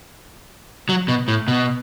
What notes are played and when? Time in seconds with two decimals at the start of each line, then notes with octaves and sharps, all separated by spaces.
0.89 F#3
1.08 B2
1.28 A2
1.48 B2